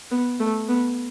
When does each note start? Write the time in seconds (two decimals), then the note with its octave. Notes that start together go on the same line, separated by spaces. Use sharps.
0.11 B3
0.40 A3
0.69 B3